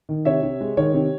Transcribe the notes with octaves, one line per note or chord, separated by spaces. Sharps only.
D#3
C3 C#5 E5
C3
G#3
D#3 C#5
C3